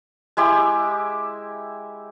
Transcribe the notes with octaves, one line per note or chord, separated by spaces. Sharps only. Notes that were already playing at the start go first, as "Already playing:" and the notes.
G#3 E4 G4